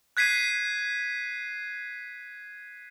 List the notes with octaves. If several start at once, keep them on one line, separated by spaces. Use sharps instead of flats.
F#6 G#6 B6 C7 D#7